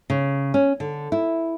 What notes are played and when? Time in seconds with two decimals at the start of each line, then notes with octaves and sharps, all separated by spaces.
0.10 C#3
0.54 C#4
0.80 D3
1.12 E4